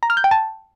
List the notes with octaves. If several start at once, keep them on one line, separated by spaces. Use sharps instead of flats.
A#5
F6
G6
G5
A5